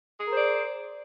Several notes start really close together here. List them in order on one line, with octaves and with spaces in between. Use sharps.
G#4 A#4 C5 D5